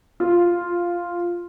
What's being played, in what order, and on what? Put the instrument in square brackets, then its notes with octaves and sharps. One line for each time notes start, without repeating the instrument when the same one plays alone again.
[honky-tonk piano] F4